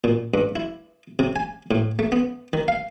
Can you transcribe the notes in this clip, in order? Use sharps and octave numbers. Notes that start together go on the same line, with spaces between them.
A#2
G2
E4
C3
G#5
A2
A3
B3
D#3
F5